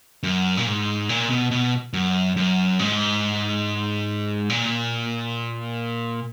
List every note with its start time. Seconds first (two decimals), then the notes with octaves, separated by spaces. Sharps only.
0.23 F#2
0.57 A#2
0.67 G#2
1.09 A#2
1.30 B2
1.51 B2
1.93 F#2
2.36 F#2
2.79 G#2
4.50 A#2